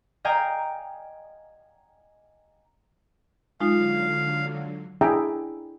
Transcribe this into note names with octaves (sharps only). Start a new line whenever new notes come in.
D#5 F5 G5 G#5 A#5
D3 F#3 G#3 D#4 F4 F5
D4 E4 G#4 E5 G5 A#5